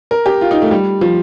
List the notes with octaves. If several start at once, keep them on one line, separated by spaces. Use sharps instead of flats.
A#4
G4
F4
D#4
A3
G3
F3